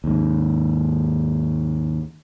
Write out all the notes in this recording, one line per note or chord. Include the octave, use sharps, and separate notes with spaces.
D#2 G#2